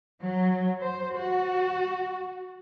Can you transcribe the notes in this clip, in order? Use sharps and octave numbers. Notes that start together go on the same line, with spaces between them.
F#3
C5
F#4